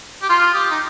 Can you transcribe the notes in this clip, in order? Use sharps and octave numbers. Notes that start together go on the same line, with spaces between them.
G4
F4 C6
G4 D#6
D#4